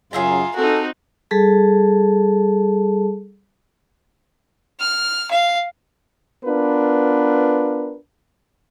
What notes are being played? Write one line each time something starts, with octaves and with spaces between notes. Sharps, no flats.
F#2 C#3 F#3 F4 G#4 E5 A#5
C4 D#4 F#4 A4
G3 G#4 A4 A5
F6
F5
B3 D4 F4 A#4 B4